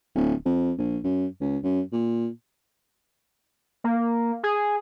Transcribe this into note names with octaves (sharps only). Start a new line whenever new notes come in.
D1
F2
A#1
F#2
C#2
F#2
A#2
A#3
G#4